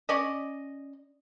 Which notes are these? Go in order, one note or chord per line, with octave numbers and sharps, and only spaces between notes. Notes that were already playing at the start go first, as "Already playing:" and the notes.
C#4 D5 D#5